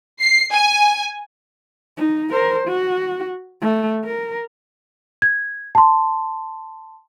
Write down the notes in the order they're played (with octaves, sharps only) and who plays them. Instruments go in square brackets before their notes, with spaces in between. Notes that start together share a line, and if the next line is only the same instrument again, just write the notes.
[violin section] C7
G#5
[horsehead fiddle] D#4
A#4 C5
F#4
A3
A#4
[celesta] G#6
A5 C6